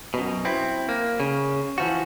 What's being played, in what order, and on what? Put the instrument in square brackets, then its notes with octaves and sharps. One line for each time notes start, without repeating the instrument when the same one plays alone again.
[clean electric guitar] F#2 B2
C4 E4
A#3
C#3
E3 F3 F#4